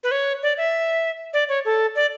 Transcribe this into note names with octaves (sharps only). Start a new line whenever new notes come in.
B4
C#5
D5
E5
D5
C#5
A4
D5